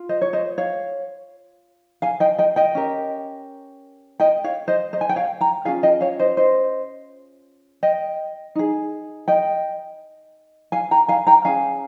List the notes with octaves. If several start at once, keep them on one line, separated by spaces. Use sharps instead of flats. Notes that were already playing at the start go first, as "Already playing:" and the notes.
Already playing: F4
C5 D#5
C#5
C5 D#5
C#5 F5
F5 G#5
D#5 G5
D#5 G5
D#5 G5
C#4 G4 A#4
D#5 G5
C#5 F5
C5 D#5
C5 D#5
G#5
G5
C#5 F5
G5 A#5
C#4 F4 G#4 F5 G#5
D#5 G5
C#5 F5
C5 D#5
C5 D#5
D#5 G5
D#4 G#4
D#5 G5
F5 G#5
G5 A#5
F5 G#5
G5 A#5
C#4 G#4 F5 G#5